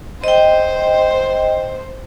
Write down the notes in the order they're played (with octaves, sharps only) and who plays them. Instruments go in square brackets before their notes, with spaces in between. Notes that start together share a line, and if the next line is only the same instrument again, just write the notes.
[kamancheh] C5 [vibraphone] D#5 G5